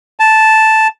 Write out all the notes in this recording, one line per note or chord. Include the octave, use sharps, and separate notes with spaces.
A5